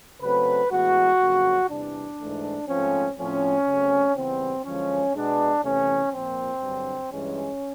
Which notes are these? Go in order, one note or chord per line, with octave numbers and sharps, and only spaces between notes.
C#3 F#3 A3 C4 B4
A2 E3 G#3 B3 F#4
F2 C#3 F#3 A#3
E2 C3 E3 G3 D4
G#2 E3 A3
G#2 F3 A3 C4 C#4
A2 F3 A3 C4 C#4
C#3 F#3 A3 C4
C#3 E3 G3 B3 C4
F#2 D3 F3 G#3 C#4
B2 G#3 B3 D4
E2 C3 E3 A3 C#4
A#2 F3 A#3 C4
G2 D3 F#3
G2 E3 G#3 C#4